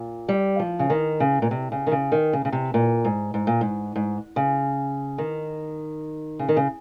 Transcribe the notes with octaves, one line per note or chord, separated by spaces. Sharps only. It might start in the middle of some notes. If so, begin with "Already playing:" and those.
Already playing: A#2
G3
F3
C#3
D#3
C#3
A#2
C3
C#3
D#3
C#3
D#3
C#3
C#3
C3
A#2
G#2
G#2
A#2
G#2
G#2
C#3
D#3
C#3
D#3
C#3